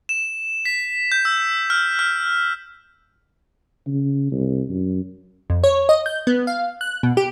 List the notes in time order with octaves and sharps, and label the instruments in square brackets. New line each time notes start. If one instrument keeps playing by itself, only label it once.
[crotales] E7
B6
G6
E6
F6
F6
[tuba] C#3
C2
F#2
[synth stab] F2
C#5
D#5
G6
B3
F5
F#6
B2
G4